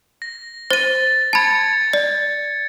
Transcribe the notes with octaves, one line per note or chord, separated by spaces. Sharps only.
A#6
C5 A6 D#7
A5 B5 G#6 A6 C#7
D5